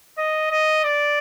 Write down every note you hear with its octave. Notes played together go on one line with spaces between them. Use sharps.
D#5
D#5
D5